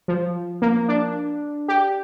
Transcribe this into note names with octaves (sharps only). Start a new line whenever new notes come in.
F3
A#3
D4
G4